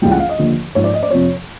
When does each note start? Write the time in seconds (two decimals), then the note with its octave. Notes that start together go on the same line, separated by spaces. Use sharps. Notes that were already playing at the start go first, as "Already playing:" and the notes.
0.02 C#2 C#3 E3 G3 G5
0.11 F#5
0.19 F5
0.29 D#5
0.38 D#2 D3 F3
0.75 G#2 F3 C#5
0.84 D5
0.94 D#5
1.03 D5
1.11 F2 C3 F3 C#5